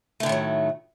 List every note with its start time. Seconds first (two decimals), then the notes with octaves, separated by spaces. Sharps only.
0.20 A3
0.23 D3
0.26 D#3
0.29 A2
0.32 F#3